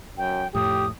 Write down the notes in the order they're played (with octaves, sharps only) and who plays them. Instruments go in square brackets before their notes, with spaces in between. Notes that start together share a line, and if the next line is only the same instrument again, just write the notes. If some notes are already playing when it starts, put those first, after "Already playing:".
[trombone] F#2 [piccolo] G5
[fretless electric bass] F2 A2 [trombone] G4 [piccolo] D#6